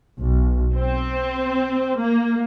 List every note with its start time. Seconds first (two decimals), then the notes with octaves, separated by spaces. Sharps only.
0.20 B1
0.77 C4
1.99 A#3